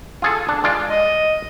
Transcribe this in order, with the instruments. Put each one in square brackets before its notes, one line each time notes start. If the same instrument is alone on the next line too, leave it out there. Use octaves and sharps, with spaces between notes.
[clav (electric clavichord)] F4 G#4 A4
D4
G#3 F4 D5
[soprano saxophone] D#5